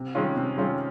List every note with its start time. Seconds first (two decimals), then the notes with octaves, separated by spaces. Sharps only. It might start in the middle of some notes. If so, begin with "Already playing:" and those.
Already playing: C3
0.15 D#3 G#3 C#4 F4
0.37 C3
0.57 D#3 G#3 C#4 F4